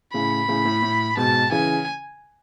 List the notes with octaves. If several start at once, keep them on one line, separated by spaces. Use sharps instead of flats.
A2 C#3 B5
A2 C#3
A2
A2
G#2 B2 A5
C#3 E3 G#5